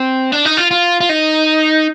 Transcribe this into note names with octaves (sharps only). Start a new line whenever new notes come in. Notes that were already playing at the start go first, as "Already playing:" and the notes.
Already playing: C4
D4
D#4
F4
F4
F4
D#4